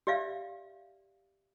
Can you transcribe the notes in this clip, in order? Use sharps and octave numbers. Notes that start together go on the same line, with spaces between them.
G4 D5 E5 F5